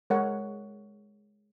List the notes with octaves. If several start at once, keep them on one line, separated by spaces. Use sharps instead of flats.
G#3 A#4 C#5 F#5